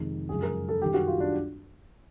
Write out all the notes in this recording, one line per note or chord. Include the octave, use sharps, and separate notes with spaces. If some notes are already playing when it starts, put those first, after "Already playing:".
Already playing: F2 C3 D#3 G#3
F#2 C#3 F3 G#3 G#4
A#4
A4
F#2 D#3 G3 G4
F#4
F4
D4